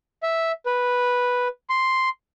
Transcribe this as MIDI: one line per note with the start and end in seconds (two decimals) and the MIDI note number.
0.23 0.52 76
0.66 1.48 71
1.70 2.09 84